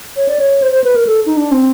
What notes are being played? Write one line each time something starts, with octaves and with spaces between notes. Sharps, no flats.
C#5
D5
C#5
C5
C5
B4
A#4
A4
D#4
D4
C4